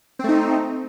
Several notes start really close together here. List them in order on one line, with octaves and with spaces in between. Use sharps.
C4 A3 D#4